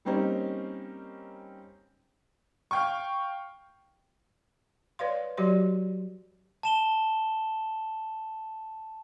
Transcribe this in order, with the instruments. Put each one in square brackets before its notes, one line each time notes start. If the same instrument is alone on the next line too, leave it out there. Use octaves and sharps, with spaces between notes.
[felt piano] G3 A#3 C4 C#4 D#4
[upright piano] F5 G5 C#6
[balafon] B4 C#5 D5 F5 C6
F#3 F#4 G4 C#5 D5 C6
[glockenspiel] A5 E7 G7